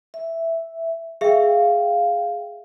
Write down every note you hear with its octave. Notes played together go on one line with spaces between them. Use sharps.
E5
G#4 E5 F5 G5